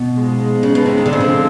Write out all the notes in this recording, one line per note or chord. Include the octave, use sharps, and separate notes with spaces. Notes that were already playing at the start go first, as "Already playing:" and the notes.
Already playing: B2
G#2 F3 G#3
C#3
B2
C3
D#3
D3
C#3 F3 G#3 C4 F4
D3